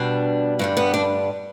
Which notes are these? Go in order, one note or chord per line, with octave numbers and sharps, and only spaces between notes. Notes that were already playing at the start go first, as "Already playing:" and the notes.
Already playing: B2 G3 D4
G2 D3 G3
B3
D4